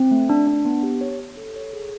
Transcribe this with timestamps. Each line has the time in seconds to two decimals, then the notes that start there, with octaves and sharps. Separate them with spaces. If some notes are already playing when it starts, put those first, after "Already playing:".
Already playing: C4
0.11 A3
0.29 D4
0.47 D4
0.65 B3
0.83 G4
1.01 C#5
1.20 C#5
1.37 A4
1.56 C#5
1.73 G#4